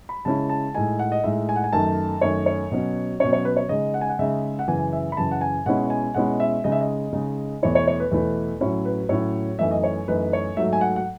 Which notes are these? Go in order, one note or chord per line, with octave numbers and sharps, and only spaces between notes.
B5
C#3 G#3 C#4 E4 A5
A5
A2 G#3 D#4 G#5
F#5
D#5
A2 G#3 D#4 E5
G#5
F#5
G#5
F#2 D#3 A3 A5
F#2 D#3 A3 C#5
C#5
B2 F#3 C#4
B2 F#3 C#4 C#5
C#5
B4
C#5
C#3 G#3 D#4 D#5
F#5
G#5
F#5
C#3 G#3 D#4 E5
F#5
F#2 C#3 E3 G#5
E5
B5
F#2 C#3 E3 A5
F#5
G#5
B2 G#3 C#4 E4 F#5
G#5
B2 G#3 C#4 E4 F#5
E5
C#3 G#3 D#4 D#5
E5
D#5
C#3 G#3 D#4
E2 B2 A3 E4 C#5
C#5
C#5
B4
E2 B2 A3 E4
A2 F#3 C#4 E4 C#5
B4
A2 F#3 C#4 E4 C#5
F#2 E3 A3 D#4 E5
D#5
C#5
F#2 E3 A3 D#4 B4
C#5
G#2 F#3 A3 E5
G#5
F#5
F#5